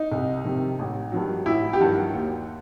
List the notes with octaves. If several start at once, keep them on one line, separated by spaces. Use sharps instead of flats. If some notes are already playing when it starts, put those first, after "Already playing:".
Already playing: D#4
C2
C3 D#3
A1
G2 D#3 F#3
A1 E4
G4
G2 D#3 F#3 F#4
D#2